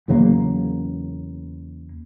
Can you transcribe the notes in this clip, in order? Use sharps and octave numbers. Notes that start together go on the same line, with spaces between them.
E2 C#3 F#3 A#3